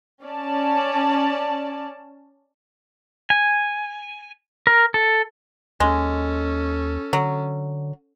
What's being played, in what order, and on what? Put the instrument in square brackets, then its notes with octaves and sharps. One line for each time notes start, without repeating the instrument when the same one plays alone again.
[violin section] C#4 D5 A5
[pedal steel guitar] G#5
A#4
A4
[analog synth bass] D#2 [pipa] G#3 [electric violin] C#4 A4
[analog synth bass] D3 [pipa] F#3